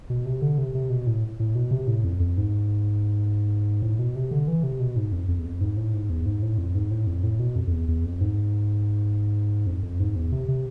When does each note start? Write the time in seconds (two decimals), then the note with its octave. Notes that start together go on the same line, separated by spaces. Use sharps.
0.10 B2
0.26 C3
0.42 D3
0.58 C3
0.75 C3
0.90 B2
1.07 A2
1.40 A2
1.55 B2
1.71 C3
1.87 A2
2.04 F2
2.20 F2
2.37 G#2
3.82 A2
3.99 B2
4.16 C3
4.31 D3
4.48 E3
4.64 C3
4.80 B2
4.96 G#2
5.12 F2
5.29 F2
5.39 E2
5.45 F2
5.61 G#2
5.77 A2
5.94 G#2
6.10 E2
6.26 G#2
6.42 A2
6.58 F2
6.75 G#2
6.91 A2
7.07 F2
7.24 A2
7.39 B2
7.56 F2
7.67 F2
7.72 E2
7.88 E2
8.05 F2
8.21 G#2
9.67 F2
9.83 F2
10.00 G#2
10.16 E2
10.32 C3
10.48 C3